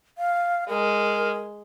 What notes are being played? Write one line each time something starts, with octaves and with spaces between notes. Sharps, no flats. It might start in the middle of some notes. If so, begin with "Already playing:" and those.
F5
G#3 A#4